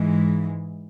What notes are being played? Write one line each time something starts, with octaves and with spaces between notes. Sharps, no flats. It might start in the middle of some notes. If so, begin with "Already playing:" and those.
Already playing: G#2 E3 G#3